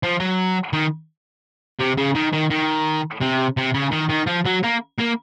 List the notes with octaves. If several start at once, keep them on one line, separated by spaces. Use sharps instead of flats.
F3
F#3
D#3
C3
C#3
D#3
D#3
D#3
C3
C3
C#3
D#3
D#3
F3
F#3
A#3
A#3